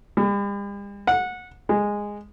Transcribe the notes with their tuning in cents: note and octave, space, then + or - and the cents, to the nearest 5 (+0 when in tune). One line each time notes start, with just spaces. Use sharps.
G3 +45
F#5 -20
G#3 -10